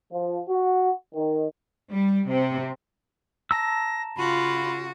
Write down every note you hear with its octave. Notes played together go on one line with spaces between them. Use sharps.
F3
F#4
D#3
G3
C3
A5 A#5 E6 A#6
C#3 F4 F#4 B5